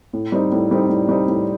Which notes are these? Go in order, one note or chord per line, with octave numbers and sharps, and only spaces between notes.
A2
G3 C4 D#4
A2
G3 C4 D#4
A2
G3 C4 D#4
A2